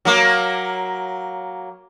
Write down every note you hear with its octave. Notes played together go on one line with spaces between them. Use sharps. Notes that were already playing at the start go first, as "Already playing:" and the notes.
F#3 A#3